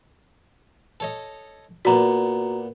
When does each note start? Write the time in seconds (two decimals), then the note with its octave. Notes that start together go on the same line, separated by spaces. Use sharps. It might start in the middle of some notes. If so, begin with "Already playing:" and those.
1.00 A4 C#5 D#5
1.85 A#2 B3 F#4 D5 A#5